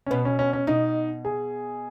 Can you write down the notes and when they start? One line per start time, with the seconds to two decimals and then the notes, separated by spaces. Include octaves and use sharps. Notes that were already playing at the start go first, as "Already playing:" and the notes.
0.06 C#4
0.10 B2 B3
0.25 C#4
0.39 C#4
0.53 C#4
0.67 B2 D#4
1.25 G#4